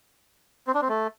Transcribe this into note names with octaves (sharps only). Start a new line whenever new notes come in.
C4
D4
C4
A3